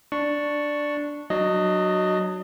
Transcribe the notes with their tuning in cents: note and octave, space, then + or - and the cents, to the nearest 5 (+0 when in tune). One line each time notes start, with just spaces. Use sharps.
D4 +0 C#6 +0
F#3 +5 D4 +35 D#5 +0